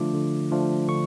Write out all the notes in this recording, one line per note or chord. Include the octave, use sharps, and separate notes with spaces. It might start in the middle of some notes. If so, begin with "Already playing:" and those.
Already playing: D3 F3 A3 D4 F4 D6
D3
F3 A3 D4 F4
D3 C#6